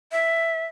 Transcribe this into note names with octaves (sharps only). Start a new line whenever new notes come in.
E5